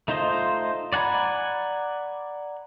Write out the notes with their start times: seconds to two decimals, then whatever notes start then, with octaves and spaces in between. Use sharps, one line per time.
0.08 A3 D#4 F4 C5 D#5
0.93 D5 F#5 G#5 A#5 B5